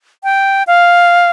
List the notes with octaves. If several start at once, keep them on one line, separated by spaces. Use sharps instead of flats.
G5
F5